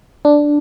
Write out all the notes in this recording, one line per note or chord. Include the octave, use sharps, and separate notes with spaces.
D4